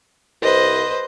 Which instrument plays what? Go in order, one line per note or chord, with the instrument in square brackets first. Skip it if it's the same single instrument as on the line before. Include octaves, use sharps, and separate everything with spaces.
[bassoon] C2 [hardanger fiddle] B4 C5 [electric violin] D#5